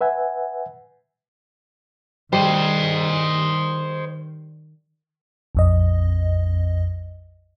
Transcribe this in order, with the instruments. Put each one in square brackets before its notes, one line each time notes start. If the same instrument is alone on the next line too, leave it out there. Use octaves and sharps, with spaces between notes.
[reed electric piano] B4 E5 F#5 G#5
[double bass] D#3 [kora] G3 [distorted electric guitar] C5 D#5
[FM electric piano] A#1 F2 D#5